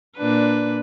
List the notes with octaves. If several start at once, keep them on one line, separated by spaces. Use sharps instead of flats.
A#2 D4 B4